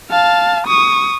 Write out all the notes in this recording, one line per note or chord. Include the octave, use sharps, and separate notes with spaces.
F5 A5
C#6 D#6